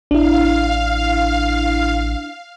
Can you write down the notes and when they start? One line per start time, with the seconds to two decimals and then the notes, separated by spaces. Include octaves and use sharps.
0.11 A1 D4 E4 F5